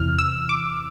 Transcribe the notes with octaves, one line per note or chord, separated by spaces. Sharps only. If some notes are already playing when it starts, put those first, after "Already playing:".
Already playing: E2 C3 E3 F6
E6
D6